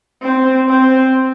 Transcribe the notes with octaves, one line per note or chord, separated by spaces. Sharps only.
C4
C4